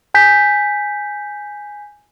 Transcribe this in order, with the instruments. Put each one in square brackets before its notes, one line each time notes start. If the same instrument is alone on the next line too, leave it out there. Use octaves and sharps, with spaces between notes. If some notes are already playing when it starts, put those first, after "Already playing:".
[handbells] G#5 G6 B6